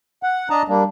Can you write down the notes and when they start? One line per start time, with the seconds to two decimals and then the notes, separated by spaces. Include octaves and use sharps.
0.23 F#5
0.50 D4 D#5 A5 A#5
0.68 G3 A#3 D4